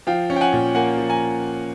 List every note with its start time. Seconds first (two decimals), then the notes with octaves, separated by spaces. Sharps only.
0.07 F3 F5 G5
0.30 C#4
0.36 G5
0.41 F#5 G#5
0.53 A#2
0.75 A#3 F#5 G#5
0.98 F3
1.09 G#5 A#5